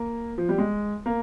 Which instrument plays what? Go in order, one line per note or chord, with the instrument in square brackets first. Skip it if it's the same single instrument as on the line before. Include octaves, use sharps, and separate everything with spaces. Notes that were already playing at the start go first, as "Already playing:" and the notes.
Already playing: [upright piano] A#3
F3
G3
G#3
A#3